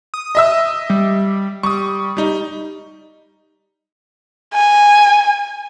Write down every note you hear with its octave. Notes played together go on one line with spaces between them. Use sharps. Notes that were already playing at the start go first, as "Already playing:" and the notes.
D#6
D#5 E5 E6
G3
G3 C#6 D#6
G3 D#4
G#5